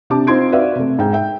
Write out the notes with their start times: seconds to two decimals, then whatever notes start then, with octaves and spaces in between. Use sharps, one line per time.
0.10 C3 D4 G4 A5 D6
0.27 C4 D#4 F4 C6 G#6 D7
0.52 F#4 B4 D5 E5 F5
0.76 C3 A3
0.99 G#2 G5
1.13 E5 G5